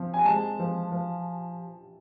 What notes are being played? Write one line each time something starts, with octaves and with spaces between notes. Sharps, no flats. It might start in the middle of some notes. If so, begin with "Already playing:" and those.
Already playing: F3 C4
G#5
G#3 A5
F3
F3